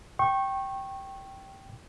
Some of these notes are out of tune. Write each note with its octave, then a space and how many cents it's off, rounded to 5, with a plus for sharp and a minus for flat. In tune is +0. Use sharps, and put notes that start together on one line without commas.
G5 -10 C#6 -25